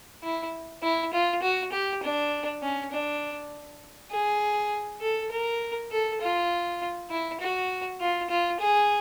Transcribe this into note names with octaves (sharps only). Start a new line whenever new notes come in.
E4
E4
F4
F#4
G4
D4
C#4
D4
G#4
A4
A#4
A4
F4
E4
F#4
F4
F4
G#4